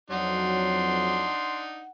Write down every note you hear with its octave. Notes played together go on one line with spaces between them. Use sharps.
F2 F#3 D4 D#4 F#5 C6